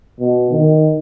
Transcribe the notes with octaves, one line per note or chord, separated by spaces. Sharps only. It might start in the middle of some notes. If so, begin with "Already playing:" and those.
B2
D#3